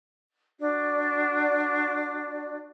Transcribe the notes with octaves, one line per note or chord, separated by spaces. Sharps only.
D4 F#4 D5